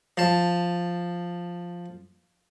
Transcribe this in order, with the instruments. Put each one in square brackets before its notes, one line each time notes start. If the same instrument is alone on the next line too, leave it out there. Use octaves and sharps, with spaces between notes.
[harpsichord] F3 A5